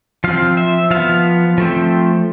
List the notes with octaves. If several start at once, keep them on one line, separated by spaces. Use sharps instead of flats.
F3 C4 F5
E5
F3 B3 F5
F3 A3 C4